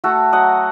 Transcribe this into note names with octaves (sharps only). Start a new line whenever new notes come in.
A3 F#4 A4
F#3 D#5 F#5